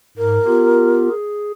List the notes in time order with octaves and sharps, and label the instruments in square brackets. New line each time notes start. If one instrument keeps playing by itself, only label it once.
[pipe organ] G#2 [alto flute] A#4
[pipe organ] B3 F4 G4
G#4